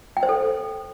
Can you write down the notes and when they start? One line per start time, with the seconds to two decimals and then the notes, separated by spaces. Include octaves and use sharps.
0.17 G5
0.23 C5
0.29 A4